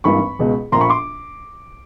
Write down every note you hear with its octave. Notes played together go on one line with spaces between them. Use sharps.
G#1 G2 E3 G3 A#3 B5 C#6
C#2 B2 G#3
A#1 A#2 F3 A#3 A#5 C6
B5 C#6
C6 D6